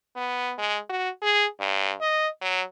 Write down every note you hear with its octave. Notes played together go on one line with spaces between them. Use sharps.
B3
G#3
F#4
G#4
G2
D#5
F#3